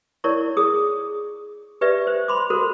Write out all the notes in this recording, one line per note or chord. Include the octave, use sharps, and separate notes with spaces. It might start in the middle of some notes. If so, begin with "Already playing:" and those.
E4 A#4 C#5 D5 C#6
G#4 D#6
G4 B4 D5 E5
C5
B5 C6 D6
F#4 A4 A#4 C5